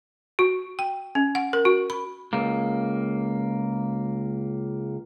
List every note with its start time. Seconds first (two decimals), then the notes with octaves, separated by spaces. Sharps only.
0.39 F#4
0.79 G5
1.15 C#4
1.35 F#5
1.53 A#4
1.65 F#4
1.90 B5
2.33 C#2 A#3